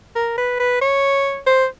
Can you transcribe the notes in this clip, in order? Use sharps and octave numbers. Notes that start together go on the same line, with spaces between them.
A#4
B4
B4
C#5
C5